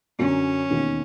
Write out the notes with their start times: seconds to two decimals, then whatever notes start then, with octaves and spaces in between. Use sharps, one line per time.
0.18 F#2 D3 F#3 C#4
0.70 E1 D#2 D#3